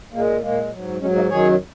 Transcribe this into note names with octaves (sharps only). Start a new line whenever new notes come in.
A#2 G#3 A#3
A#2 G#3 A#3
G#2 F#3
G#2 F#3 G#3 C#4
A#3 D#4
F#2 D#3 F#3 G#4 C#5